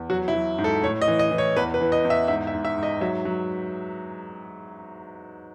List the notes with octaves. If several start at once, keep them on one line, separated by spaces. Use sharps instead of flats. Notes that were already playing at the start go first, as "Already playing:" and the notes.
Already playing: E2
F#3 F#4
E4
F#3
G#2
A4
A2 C#5
D#5
E3
D#5
E3
C#5
E2 B4
B4
E3
D#5
E2
E5
G#2 E5
E5
G#2
E5
G#2
D#5
F#3 E5
F#3